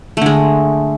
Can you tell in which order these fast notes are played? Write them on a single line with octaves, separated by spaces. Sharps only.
A3 D3 G#3